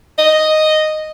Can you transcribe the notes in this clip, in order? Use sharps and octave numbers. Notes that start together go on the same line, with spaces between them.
D#5